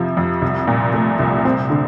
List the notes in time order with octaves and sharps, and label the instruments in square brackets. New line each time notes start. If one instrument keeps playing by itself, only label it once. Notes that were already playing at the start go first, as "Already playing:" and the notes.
Already playing: [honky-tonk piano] F2 C3 F3
F2
C2
A#2
A3
C2
C4
D3